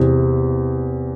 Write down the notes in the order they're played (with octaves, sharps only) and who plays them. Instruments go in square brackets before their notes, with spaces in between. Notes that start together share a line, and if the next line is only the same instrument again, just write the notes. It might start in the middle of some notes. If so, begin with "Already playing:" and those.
Already playing: [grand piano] E2 C3